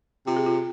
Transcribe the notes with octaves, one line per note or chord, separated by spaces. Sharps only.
C3 F4
G#4
F4